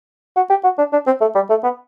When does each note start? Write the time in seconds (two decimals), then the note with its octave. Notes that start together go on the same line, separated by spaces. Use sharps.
0.36 F#4
0.50 G4
0.64 F#4
0.78 D4
0.92 D4
1.06 C4
1.21 A3
1.35 G3
1.49 A3
1.63 B3